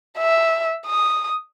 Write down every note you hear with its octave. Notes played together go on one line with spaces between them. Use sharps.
E5
D#6